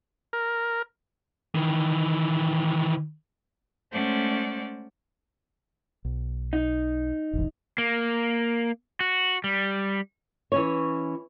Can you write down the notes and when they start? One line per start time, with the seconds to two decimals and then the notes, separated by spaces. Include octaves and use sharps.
0.33 A#4
1.55 D#3 E3
3.92 G#3 A3 C#4 C5 D5 F#5
6.05 B1
6.53 D#4
7.33 E1 A1 E2
7.78 A#3
9.00 F#4
9.44 G3
10.52 E3 C#4 C#5